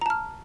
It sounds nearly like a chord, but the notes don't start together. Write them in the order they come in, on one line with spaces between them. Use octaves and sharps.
A#5 A5 F6